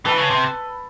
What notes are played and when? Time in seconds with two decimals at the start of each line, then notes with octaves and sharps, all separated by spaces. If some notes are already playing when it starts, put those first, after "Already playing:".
0.05 E3 A4 B4
0.18 C#3
0.30 C3